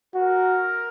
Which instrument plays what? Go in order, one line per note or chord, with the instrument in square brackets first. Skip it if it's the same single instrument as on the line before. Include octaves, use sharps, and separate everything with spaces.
[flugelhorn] F#4 [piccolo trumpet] A#4